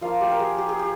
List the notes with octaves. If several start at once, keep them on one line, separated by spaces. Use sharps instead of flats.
F3 A#3 F4 F5
G4
A#4
G#4
G4
G#4
G4